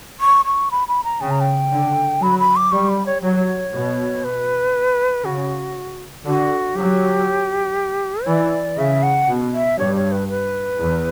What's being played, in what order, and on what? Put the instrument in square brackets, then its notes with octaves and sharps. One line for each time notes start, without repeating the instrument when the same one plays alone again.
[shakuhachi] C#6
C#6
B5
B5
A#5
[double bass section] C#3 [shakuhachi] G5
[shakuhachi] A#5
G5
[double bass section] D3
[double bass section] F#3 [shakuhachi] B5
[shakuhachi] B5
D6
[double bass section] G3 [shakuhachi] C#6
[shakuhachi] B5
C#5
[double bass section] F#3 [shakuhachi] C#5
[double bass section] B2
[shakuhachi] B4
[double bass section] C#3 [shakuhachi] F#4
[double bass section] D3 [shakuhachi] F#4
[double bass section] F#3 [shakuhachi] G4
[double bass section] E3 [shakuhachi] D5
[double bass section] C#3 [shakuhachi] E5
[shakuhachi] F#5
[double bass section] B2
[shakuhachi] E5
[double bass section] G2 [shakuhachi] C#5
[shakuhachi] C#5
B4
B4
[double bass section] E2